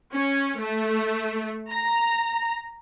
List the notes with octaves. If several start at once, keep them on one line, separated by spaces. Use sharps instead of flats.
C#4
A3
A#5